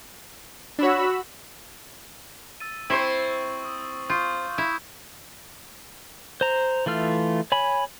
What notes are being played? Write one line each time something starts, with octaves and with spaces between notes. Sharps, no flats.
D4 F#4 C#5 B5 E6
E6 A6 D#7
C4 E4 C5 C#6 F#7
D#6 E6
F4 C#6 D#6 G6
E4
C5 A#5
E3 A3 F4 F6
C#5 G#5 B5